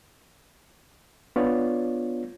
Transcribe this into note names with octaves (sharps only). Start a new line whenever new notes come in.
B3 D4 F4 C#5 D5